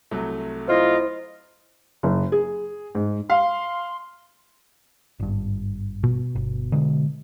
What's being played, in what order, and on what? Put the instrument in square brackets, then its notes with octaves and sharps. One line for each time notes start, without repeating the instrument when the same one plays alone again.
[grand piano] C2 F#3 A3
[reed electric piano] E4 C5 [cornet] F4 [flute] D#5
[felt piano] F#1
G#4
G#2
[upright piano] F5 [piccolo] C6
[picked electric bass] G#1 G2
[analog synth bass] B2
[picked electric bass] G1
D3 G#3